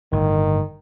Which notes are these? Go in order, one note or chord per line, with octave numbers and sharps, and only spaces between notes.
G1 A2 D#3